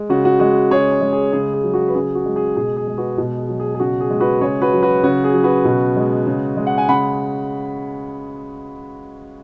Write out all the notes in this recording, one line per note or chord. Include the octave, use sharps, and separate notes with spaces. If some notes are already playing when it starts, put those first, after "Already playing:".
Already playing: G#3
C#3 F#4
F#4
G#3 F#4
C#3 G#4 C#5
G#4
G#3
G#4
C#3 G#4
G#4
F#3
F#4
B4
C#3 G#4
F#4
G#3
G#4
B2 G#4
G#4
G#3
F#4 B4
B2
G#4
F#3
G#4
G#4
C#3 F#4
G#4
G#3
F#4 B4
C#3 G#4 C#5
F#4 B4
F#3
F#4 B4
C#3 F#4
G#4
F#3
F#4 B4
B2
G#3
C#3
G#3
F#5
G#5
C#3 F#5 B5